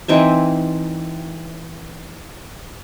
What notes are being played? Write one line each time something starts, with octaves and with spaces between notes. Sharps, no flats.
E3 C4 D#4 E5